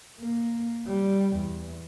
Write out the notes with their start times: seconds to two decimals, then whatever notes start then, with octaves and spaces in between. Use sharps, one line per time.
0.20 A#3
0.87 G3
1.37 E2